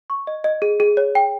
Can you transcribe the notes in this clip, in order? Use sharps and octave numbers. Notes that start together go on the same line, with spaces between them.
C#6
D#5
D#5
G#4
G#4
C#5
G5